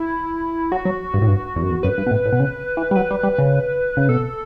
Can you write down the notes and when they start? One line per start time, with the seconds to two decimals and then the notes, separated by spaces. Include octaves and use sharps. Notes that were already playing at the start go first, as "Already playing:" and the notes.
Already playing: E4
0.72 F#3 F#4
0.85 F#3
1.14 G2
1.21 A2
1.27 G2
1.56 E2
1.63 F#2
1.70 E2
1.83 F#2 B4
1.98 G2
2.07 B2
2.11 A2
2.25 A2
2.33 B2
2.40 C#3
2.77 E3
2.91 G3
2.95 F#3 B4
3.11 G3
3.23 G3
3.38 C#3
3.97 C#3
4.09 B2 A4